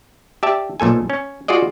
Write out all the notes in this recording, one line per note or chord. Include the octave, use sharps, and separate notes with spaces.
G4 D5 E5 A5
B1 A#2 A4 G#5
C#4
F4 F#4 G#4 D5 D#5